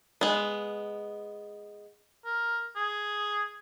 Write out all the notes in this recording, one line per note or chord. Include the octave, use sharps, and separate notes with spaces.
G#3 B3
A#4
G#4